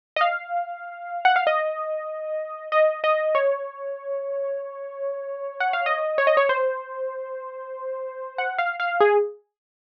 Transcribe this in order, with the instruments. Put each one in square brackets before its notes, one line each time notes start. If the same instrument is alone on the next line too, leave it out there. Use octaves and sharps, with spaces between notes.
[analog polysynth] D#5
F5
F#5
F5
D#5
D#5
D#5
C#5
F#5
F5
D#5
C#5
D#5
C#5
C5
F#5
F5
F5
G#4